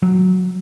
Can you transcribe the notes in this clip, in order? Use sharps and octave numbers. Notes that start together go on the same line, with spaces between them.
F#3